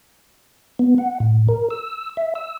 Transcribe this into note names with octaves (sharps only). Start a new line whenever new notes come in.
B3
F#5
A2
A#4
E6
E5
E6